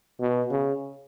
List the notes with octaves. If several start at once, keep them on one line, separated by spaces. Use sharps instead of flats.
B2
C#3